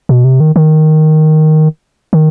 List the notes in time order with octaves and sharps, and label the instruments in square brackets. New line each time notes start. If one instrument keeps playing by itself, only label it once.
[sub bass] B2
C3
D#3
D#3
D#3